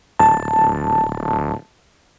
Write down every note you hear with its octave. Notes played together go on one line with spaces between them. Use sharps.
D1 A5